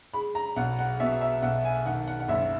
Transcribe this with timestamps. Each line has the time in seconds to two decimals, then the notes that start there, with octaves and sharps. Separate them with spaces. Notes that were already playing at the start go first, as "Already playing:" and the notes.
0.13 G#3 B5
0.35 A#5
0.56 B1 F#5
0.79 F#5
1.00 B2 E5
1.21 E5
1.42 B1 F#5
1.65 G#5
1.86 D#3 F#5
2.08 F#5
2.20 F#5
2.28 F#1 E5